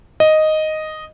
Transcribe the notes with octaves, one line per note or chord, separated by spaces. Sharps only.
D#5